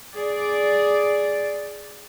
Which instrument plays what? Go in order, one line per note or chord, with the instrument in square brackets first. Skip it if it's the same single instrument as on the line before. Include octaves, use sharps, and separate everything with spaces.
[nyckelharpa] G#4 [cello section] D5